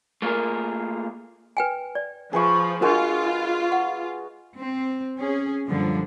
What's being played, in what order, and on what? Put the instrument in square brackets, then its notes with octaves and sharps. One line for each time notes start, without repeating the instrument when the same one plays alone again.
[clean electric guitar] A3 A#3 F4 G#4 A#4
[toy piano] B4 G5 G#5
D5
[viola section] F3 [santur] G#4 B4 C#6
[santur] G#3 F#4 [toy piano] D4 A#4 [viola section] F4
[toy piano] F#5
[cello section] C4
C#4 G#4
F#2 A#2 D3 F3 G3